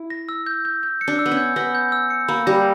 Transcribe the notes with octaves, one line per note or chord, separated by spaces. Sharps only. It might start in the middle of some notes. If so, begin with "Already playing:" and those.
Already playing: E4
A#6
E6
G6
G6
G6
C#7
D4
E6
B3
C#4
G6
B3 A#6
G6
E6
C#7
A#3 B5
G3 A#6